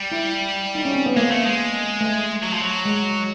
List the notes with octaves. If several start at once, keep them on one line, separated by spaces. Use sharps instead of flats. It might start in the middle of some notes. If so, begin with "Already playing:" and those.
Already playing: G3
E4
D#4
C#4
C4
B3
G#3 A#3
A3
G#3
A3
F#3
F3
F#3
G#3